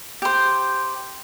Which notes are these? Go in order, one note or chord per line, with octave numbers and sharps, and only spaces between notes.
G4 C5